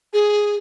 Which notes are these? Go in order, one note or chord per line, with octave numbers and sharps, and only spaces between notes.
G#4